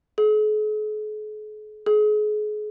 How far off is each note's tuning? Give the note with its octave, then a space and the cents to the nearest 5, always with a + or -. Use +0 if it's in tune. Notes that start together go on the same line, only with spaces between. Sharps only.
G#4 +45
G#4 +35